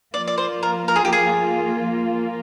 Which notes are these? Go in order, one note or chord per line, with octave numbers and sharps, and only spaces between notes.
F3 A#3 F4 D5
D5
C5
A#4
A#4
G#4
G4
G#4